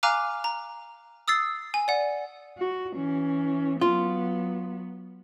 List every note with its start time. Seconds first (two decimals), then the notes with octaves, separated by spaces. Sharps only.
0.03 F5 G#5 A#5 D6 F6 F#6
0.44 A#5
1.28 D#6 E6 A6 C7
1.74 G#5
1.88 D5 F#5
2.58 F#4
2.93 E3 C#4
3.81 F#3 B3 F4